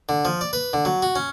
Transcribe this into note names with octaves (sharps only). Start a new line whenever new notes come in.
D3
F3
D5
B4
D3
F#3
F#4
C#4